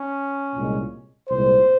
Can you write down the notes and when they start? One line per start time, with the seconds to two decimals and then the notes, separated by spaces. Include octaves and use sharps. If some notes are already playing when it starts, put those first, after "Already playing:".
Already playing: C#4
0.55 C2 A#2 G#3
1.29 C2 A#2 G#3 C5